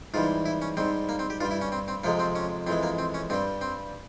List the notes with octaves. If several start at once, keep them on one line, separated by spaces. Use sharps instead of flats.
G#2 E3 G3 F4
E4
C#4
G#2 G3 C4
A#3
C4
G4
G2 G3 F4
E4
C#4
C4
C4
F2 C3 F3 G#3 A#3
C4
C#4
F2 E3 G#3 C4
A#3
C4
C#4
G2 G3 C4
C4